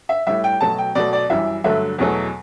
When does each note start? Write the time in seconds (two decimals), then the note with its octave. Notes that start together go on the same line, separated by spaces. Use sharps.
0.09 E5
0.27 A2 G3 E5
0.44 G5
0.61 B2 F#3 A3 A5
0.78 G5
0.95 B2 F#3 A3 D5
1.13 D5
1.30 F#2 E3 G3 E5
1.64 G2 D3 F#3 A3 E5
1.98 E2 B2 F#3 A3